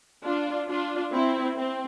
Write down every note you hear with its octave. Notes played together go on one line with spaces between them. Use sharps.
D4 F4
D4 F4
C4 E4
C4